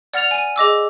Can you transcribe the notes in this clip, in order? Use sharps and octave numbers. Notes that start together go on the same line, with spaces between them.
D5 F#5 F6 A6 F7
G#5 D#7
G#4 D#5 D6 E6